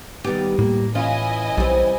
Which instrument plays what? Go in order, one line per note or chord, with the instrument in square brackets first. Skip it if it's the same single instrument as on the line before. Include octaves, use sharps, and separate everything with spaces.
[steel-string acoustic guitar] D#3 B3 [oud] G3 G4
[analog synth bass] A2 [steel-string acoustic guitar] A#3
[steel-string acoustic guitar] E3 C#4 [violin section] E4 D#5 G#5 [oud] F4
[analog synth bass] B1 [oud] G3 C4